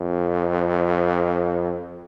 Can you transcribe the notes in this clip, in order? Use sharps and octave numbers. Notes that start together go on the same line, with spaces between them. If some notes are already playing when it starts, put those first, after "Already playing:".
Already playing: F2